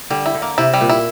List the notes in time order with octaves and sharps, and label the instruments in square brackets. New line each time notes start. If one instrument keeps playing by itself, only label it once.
[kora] D3 [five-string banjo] G3
[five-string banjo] E4
[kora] D3
[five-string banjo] A#3
[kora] C3 [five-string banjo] E4
[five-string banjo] G3
[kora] A#2
[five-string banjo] E4